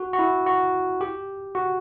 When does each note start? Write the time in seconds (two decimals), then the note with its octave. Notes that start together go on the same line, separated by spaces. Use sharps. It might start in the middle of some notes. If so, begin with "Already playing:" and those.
Already playing: F#4
0.13 F#4
0.19 E4
0.46 F#4
1.01 G4
1.55 F#4